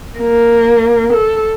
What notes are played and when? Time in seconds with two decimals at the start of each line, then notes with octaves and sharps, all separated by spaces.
0.19 A#3
1.13 A4